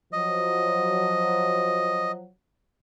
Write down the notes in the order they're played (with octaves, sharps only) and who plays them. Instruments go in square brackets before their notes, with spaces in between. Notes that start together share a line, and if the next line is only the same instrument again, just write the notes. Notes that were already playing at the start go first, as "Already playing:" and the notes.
[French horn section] F3 F#3 [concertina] D#5